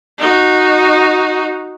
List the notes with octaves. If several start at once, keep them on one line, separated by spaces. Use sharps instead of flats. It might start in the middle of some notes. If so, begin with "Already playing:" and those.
D#4 F#4